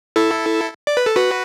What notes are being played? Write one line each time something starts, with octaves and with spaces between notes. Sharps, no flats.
E4 A4
D5
B4
A4
F#4 B4